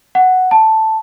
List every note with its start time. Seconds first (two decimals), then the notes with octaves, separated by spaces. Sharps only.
0.15 F#5
0.51 A5